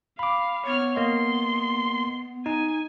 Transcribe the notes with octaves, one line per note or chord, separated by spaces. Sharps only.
F5 B5 D6
B3 C#5 F6
A#3 D#5 C6
D#4 G#5